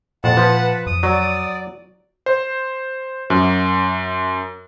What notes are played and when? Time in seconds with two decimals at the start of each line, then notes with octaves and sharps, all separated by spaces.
0.24 F2 A#2 F#5 A5
0.37 F3 B4
0.87 F2 D#6
1.03 F#3 D5
2.26 C5
3.30 F#2